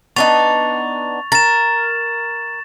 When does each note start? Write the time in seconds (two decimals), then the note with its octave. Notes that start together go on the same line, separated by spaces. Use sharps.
0.16 B3 D4 D#4 C#6 A6 F7
1.32 A#4 A6 E7